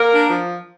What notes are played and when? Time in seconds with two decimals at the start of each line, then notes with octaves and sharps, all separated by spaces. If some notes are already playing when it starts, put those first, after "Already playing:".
Already playing: A#3 A#4
0.11 D4
0.30 F3